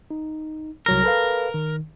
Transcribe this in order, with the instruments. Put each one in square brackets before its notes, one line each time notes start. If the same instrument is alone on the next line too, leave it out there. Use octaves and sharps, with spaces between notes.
[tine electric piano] D#4
[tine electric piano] C2 F#3 A#6 [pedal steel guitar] A#4
[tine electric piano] A4 B4 F5
D#3